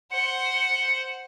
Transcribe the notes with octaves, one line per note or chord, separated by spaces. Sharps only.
C5 F#5 C#7